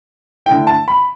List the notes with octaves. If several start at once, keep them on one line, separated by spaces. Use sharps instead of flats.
D3 A3 E4 G5
A5
B5